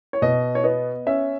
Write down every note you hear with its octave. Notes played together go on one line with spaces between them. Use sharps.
C#5
B2 D#5
C#5
B3 D#5
C#4 E5